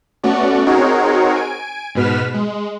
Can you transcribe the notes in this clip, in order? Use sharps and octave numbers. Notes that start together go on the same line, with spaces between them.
A3 B3 C#4 F#4 D5
C4 D#4 F#4 G#4 A#4 C#5
G#5 D7
G#2 B2 B4 F6 B6 E7
G#3